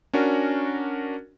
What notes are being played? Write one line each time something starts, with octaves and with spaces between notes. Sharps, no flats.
C#4 D4 F#4 A#4